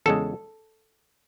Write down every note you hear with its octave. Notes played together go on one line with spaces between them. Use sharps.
E2 C#3 G#3 A4